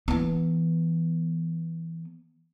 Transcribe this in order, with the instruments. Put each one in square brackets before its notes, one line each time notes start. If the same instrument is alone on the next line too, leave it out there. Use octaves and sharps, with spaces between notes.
[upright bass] E3 B3